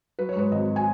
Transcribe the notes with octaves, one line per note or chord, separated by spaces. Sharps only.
F#3 B4
C#5
G#2 B4
G#1 D#5
G#5